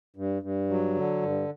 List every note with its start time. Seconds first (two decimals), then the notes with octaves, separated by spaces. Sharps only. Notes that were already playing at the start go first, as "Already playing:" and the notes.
0.16 G2
0.42 G2
0.69 F#3
0.95 D3
1.22 G2